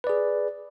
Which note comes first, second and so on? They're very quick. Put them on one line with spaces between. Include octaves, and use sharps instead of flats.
B4 D5 G#4